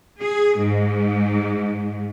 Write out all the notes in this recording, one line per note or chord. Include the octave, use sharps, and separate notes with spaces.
G#4
G#2